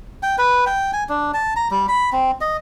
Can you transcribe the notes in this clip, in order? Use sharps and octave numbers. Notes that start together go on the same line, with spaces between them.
G5
B4
G5
G#5
D4
A5
A#5
G3
B5
C4
D#5